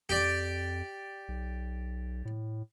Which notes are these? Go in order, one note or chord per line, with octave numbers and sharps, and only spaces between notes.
F2 G4 D5
B1
A2